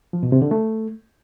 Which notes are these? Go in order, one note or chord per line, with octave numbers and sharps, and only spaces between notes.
F3
B2
C3
D3
A3